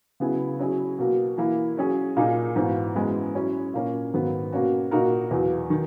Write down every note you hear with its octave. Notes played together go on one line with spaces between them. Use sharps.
C#3 F#3 B3 E4 G#4
F#3 C#4 E4 G#4
B2 F#3 A#3
E3 A#3 E4
F#3 C#4 G#4
A#2 A#3 D#4 G#4
G#2 E3 B3 F#4
F#2 E3 G#3 B3
F#3 C#4 E4
A#2 A#3 C#4
G#2 D#3 F#3 B3
B2 A#3 C#4 F#4
A#2 A#3 D#4 F#4 A#4
E2 B2 F#3
D#3